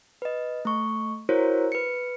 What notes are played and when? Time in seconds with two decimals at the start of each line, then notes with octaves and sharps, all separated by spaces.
0.22 B4 D#5
0.65 A3 C#6
1.29 E4 F#4 A#4 C5 C#5
1.72 B4 C#7